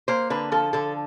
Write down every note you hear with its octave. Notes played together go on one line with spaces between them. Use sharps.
A#3 C5
D3 B4
F3 A4
D3 A4